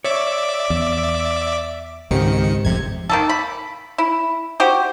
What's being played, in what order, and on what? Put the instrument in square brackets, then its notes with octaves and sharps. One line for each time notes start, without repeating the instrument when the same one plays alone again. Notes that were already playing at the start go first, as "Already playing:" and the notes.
[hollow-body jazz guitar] C#5 [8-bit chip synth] D5 E5 D6
[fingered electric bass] E2
[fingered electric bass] C#2 [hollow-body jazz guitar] G#2 C4 G4 [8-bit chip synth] D#3 C#7
[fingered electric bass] G1 F2 A2 [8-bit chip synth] C3 G#6
[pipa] D#3 A#3 A4
B5
E4
F#4 G4 C5